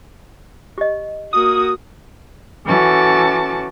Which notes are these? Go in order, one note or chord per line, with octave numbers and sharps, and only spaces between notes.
G4 D#5
A#3 F#4 D#6
E3 C#4 F#4 A4 A5 D6